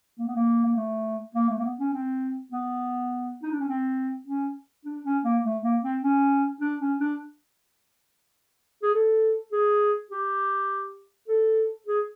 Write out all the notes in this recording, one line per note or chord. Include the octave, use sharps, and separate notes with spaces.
A#3
B3
A#3
A#3
A3
A#3
A3
A#3
B3
C#4
C4
B3
D#4
D4
C#4
C4
C#4
D4
C#4
A#3
A3
A#3
C4
C#4
D4
C#4
D4
G#4
A4
G#4
G4
A4
G#4